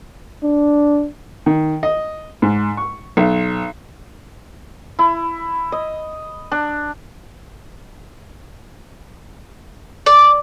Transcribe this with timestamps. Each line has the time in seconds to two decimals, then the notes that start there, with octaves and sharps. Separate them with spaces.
0.44 D4
1.46 D#3
1.83 D#5
2.42 G#2
2.77 C#6
3.17 B1
4.99 E4
5.72 D#5
6.51 D4
10.06 D5